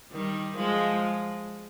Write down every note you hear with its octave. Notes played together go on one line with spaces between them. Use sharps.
D#3 G3
F3 G#3